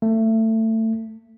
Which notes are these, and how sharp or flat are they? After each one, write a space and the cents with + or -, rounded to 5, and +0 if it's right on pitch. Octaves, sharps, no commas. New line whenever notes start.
A3 +20